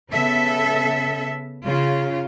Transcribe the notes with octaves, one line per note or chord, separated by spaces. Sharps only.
C#3 B3 A4 E5
C#3 F4